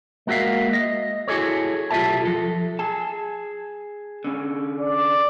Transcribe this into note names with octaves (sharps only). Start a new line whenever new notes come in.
G#3 A#3 F#4 G4 E5 F5
D#5
E4 F#4 G#4 A4 C#5
B1 F4 G4 A4 E5 A5
F3 A4
G#4 A5
D3 C#4
D5